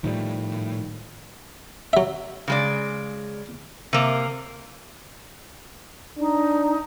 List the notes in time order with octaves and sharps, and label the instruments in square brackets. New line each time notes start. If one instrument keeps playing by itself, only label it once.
[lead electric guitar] A2 [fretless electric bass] D#3 F3 G3
[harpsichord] F#3 E5
[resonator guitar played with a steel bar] C#3 G#3 D5
C3 A#3
[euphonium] D4 [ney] D#4